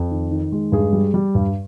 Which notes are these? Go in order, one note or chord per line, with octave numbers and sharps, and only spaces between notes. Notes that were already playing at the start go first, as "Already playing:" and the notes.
Already playing: F2
D#3
D#3
G#3
G2 G#4
G3
G3
G2